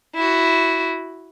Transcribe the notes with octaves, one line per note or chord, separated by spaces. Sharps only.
E4 F#4